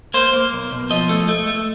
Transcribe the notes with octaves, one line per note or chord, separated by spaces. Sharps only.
A#3 C5
A#3
B1
B2
F3 D#5
A3
A3
A3